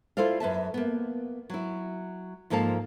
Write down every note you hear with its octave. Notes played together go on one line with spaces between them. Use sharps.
E4 F4 A4 C5 D5 F5
F#2 B4 E5 A5
A#3 B3
F#3 E4
G#2 F3 A#3 A4 F5 A5